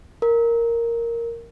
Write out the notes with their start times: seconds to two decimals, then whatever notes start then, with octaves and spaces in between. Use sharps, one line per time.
0.22 A#4